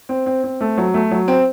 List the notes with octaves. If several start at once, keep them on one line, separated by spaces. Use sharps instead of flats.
C4
C4
C4
A3
F#3
A3
F#3
C4